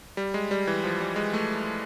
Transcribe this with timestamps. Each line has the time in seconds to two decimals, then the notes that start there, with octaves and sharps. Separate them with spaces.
0.17 G3
0.34 G#3
0.51 G3
0.67 E3
0.84 F3
1.00 G3
1.16 G#3
1.33 A3